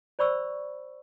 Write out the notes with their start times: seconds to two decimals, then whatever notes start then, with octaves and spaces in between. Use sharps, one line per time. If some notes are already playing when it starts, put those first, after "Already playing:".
0.19 C5 D5 B5 C#6 E6